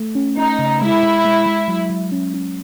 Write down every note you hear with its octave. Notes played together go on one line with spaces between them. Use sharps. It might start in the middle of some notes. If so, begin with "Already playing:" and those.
Already playing: A3
C#4
C#4 D#4
C#3
G#3 E4
G#3
G#3
G#3
F#3
F#3
C#4
C#4